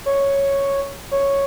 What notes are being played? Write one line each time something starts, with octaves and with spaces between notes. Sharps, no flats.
C#5
C#5